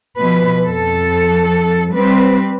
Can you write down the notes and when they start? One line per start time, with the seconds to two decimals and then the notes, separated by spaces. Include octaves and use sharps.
0.20 B2 F3 B4
0.62 F2 A4
1.92 G3 C4 B4